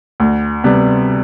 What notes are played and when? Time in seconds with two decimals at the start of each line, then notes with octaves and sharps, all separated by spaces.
0.20 D2
0.64 C3 G3 B3